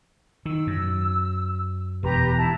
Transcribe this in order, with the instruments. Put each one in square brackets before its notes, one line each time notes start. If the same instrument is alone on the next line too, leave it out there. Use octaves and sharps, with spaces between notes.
[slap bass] D#3 [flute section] E6
[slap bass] F#2
[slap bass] E1 [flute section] G4 B4 A#5
[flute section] E4 A5